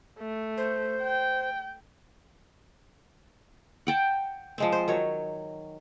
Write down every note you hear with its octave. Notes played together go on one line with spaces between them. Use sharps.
A3
C5
G5
F#5 G5 A5
F3 G#3 C4
C5
D#3 F#3 C#5